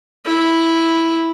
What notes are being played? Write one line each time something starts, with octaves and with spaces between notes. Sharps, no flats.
E4